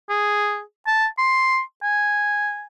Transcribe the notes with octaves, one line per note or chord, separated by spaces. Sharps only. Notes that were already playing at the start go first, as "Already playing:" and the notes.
G#4
A5
C6
G#5